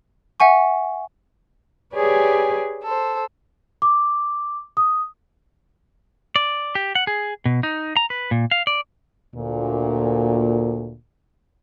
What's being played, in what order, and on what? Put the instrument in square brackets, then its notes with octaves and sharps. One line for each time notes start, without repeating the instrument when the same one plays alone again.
[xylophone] E5 F#5 G#5 C#6
[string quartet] G4 G#4 B4 C#5 D5 G#5
A4 C5
[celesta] D6
D#6
[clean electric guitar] D5
G4
F#5
G#4
B2
D#4
A#5
B4
A#2
F5
D5
[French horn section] D2 A#2